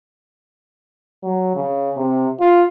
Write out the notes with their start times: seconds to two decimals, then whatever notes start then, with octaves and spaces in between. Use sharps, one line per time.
1.23 F#3
1.55 C#3
1.97 C3
2.39 F4